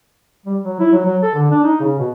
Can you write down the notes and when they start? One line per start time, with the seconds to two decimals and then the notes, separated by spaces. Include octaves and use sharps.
0.46 G3
0.63 F#3
0.80 E4
0.92 F#3
1.05 F#3
1.23 A4
1.34 D3
1.51 D4
1.64 D#4
1.80 C#3
1.98 B2